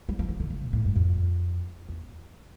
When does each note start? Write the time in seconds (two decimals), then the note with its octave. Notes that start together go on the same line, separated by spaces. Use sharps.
0.09 G3
0.19 F3
0.29 E3
0.40 D3
0.50 C#3
0.61 A#2
0.73 A2
0.85 G2
0.96 F2
1.89 E2